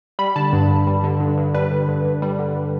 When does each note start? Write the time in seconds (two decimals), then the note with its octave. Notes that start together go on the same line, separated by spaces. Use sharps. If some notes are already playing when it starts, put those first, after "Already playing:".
0.19 G3 B5
0.36 D3 A5
0.53 G2
0.70 G2
0.87 G3
1.04 D3
1.20 G2
1.38 G2
1.54 G3 B4
1.71 D3
1.89 G2
2.05 G2
2.22 G3
2.39 D3